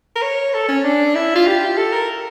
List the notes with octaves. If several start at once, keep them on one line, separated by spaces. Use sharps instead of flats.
A#4
C#5
A4
C#4
D4
E4
F4
G4
A4
A#4